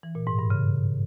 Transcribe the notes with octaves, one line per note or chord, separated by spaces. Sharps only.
E3
A#2
G#2
G2
C#3